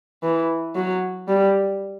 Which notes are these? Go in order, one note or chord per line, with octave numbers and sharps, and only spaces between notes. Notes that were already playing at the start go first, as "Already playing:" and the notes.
E3
F#3
G3